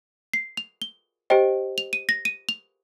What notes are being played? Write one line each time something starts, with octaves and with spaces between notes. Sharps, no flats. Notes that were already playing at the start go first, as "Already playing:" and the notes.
C7
F7
G7
G4 C5 D#5 G5
F7
D#7
A#6
D#7
F7